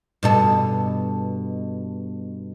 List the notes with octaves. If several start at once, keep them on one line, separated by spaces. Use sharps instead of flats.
G2 B2 A4